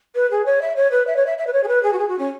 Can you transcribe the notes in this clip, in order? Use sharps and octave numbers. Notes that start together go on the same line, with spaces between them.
B4
G#4
C#5
E5
C#5
B4
E5
C#5
E5
E5
B4
C#5
G#4
B4
G#4
F#4
G#4
F#4
C#4